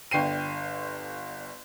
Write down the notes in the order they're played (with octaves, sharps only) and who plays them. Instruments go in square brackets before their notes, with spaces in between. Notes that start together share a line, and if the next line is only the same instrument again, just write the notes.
[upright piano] G1 D3 G5 C7 D#7